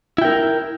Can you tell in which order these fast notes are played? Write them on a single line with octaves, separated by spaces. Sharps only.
E4 G5 A#4